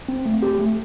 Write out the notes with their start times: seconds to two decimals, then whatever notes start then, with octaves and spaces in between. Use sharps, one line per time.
0.09 C4
0.26 A3
0.42 G4
0.59 A3